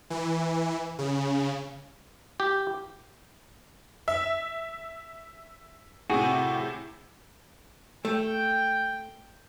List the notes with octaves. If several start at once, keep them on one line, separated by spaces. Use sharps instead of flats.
E3
C#3
G4
E5
A2 C3 F#4 G#4
A3 G5